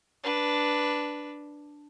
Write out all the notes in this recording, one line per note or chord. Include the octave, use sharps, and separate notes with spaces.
D4 B4